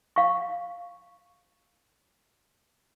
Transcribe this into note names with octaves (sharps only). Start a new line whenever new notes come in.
F5 C#6